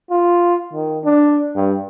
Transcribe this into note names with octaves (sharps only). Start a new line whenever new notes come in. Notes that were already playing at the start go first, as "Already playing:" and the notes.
F4
D#3
D4
G2